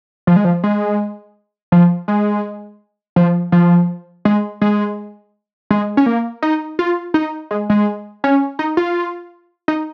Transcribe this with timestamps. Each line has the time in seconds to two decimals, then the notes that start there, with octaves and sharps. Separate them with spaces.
0.27 F3
0.36 G#3
0.45 F3
0.64 G#3
1.72 F3
2.08 G#3
3.16 F3
3.52 F3
4.25 G#3
4.62 G#3
5.71 G#3
5.97 C#4
6.06 A#3
6.42 D#4
6.79 F4
7.14 D#4
7.51 G#3
7.70 G#3
8.24 C#4
8.59 D#4
8.77 F4
9.68 D#4